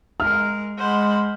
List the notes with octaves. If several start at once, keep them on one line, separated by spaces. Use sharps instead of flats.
G#3 A#4 F6
G#3 C5 F#5 B5